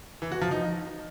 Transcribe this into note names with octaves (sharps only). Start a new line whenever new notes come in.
E3
F#4
F3
D#4